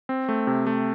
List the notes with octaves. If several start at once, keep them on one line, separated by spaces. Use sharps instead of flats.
C4
A3
C3
A3